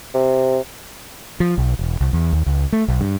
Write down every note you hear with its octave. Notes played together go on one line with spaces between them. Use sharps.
C3
F3
B1
E1
C2
E2
D#2
C#2
A3
B1
G2